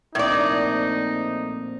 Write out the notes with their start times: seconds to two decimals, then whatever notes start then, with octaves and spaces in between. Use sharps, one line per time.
0.15 A#1 A2 C4 D#4 D5